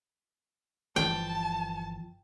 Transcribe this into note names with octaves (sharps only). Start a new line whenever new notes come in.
G1 E3 F3 G5 A5